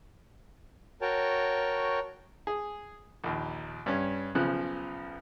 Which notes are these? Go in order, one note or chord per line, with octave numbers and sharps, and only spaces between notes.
F#4 A#4 C#5 G5 A5
G#4
A#1 D#2
G2 C#4
B1 C#3 F3 F#6